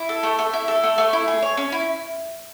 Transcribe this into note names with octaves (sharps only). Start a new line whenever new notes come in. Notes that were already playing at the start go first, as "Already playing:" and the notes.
Already playing: E4
A4
A3
A3
E4
A4
A3
A3
E4
G#4
C#5
C#4
E4